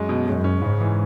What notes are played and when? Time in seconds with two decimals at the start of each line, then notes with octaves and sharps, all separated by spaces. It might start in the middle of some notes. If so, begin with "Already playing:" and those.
Already playing: F#2 G#3
0.09 B2
0.26 F#2 G#3
0.44 C#4
0.62 G#2 C#3
0.81 E3